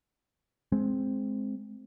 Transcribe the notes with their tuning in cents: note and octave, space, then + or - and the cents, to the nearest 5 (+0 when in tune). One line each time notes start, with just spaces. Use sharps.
G#3 +15 C4 +0